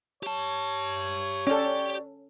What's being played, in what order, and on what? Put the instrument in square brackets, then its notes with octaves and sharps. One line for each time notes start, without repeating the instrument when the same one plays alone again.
[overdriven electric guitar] G4 A5 [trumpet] C#5
[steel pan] C#4 A4 [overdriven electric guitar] G4 G5 [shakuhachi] D5